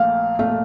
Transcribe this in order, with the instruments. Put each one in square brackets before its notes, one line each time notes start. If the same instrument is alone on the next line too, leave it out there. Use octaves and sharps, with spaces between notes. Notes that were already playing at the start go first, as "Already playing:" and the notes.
Already playing: [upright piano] A#1 A#2 A3 [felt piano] F5
[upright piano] A#2 A3 [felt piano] F5